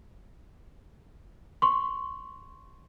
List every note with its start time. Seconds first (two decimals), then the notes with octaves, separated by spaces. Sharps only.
1.62 C6 C#6